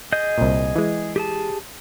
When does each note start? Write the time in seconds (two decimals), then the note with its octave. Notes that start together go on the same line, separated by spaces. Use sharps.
0.12 G#4 D#5 G6
0.38 C2 A#2
0.76 E3 G#3
1.16 G4 G#4 A5